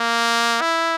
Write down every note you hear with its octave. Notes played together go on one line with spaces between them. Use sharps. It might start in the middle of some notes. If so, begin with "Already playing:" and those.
Already playing: A#3
E4